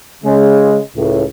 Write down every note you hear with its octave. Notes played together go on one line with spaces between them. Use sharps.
C#3 G#3
C#2 A2